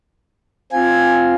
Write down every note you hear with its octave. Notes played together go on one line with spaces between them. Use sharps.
C4 F4 G#5